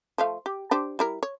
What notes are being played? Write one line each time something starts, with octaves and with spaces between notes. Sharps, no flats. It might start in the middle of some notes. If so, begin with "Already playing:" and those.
F3 A3 F5
G4
D4 G4 C5
G3 E4 A#4
C#5